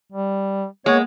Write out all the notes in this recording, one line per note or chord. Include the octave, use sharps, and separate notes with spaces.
G3
G#3 A#3 B3 C#5